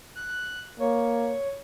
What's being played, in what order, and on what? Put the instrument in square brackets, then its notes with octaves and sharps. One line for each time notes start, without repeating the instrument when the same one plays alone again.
[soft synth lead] F#6
[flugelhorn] A#3 [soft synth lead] C#5